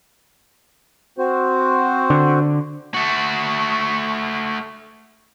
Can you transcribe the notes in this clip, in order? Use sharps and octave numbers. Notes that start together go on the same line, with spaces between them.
C4 F#4 C5
D3
A3 F#4